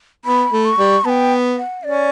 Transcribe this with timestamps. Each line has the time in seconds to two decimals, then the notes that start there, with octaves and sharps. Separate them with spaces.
0.25 B3 B5
0.52 A3
0.65 C#6
0.78 G3
1.05 B3 A5
1.09 G5
1.57 F#5
1.83 C#4 D5